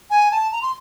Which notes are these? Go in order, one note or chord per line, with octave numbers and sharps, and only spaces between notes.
G#5
A5
A#5
C6